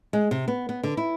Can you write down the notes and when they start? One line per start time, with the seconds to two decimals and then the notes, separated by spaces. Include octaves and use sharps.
0.13 G#3
0.31 C3
0.48 B3
0.69 B3
0.83 D3
0.97 E4